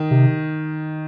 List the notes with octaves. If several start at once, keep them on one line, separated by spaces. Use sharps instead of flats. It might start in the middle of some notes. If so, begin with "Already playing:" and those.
Already playing: D#3
C3